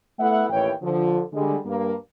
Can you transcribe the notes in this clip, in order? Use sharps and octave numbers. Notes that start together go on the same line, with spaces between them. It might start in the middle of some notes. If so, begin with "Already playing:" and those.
A3 B3 E4 A4 E5 F#5
A1 D#2 E3 C#5 G5
D3 F3
D3 G3 G#3
G2 A#3